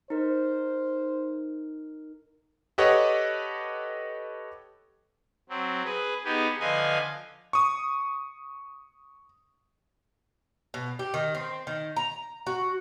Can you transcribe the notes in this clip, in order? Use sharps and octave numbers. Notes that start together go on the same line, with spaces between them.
D#4 A#4 C5
G4 A4 B4 C#5 D#5 F#5
F#3 C4
G#4 B4
B3 D#4 G4 G#4
D3 F3 B4 D#5 F5 G#5
C#6 D#6
B2
G4
D#3
C4
D#3
A#5
F#4